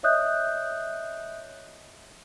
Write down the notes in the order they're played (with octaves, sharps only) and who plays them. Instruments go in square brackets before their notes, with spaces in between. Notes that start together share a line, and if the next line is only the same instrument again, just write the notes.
[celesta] C#5 D#5 E5 D#6 F#6 G6